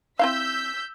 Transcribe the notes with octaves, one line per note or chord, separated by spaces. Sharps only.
C4 E4 F5 E6 G6 B6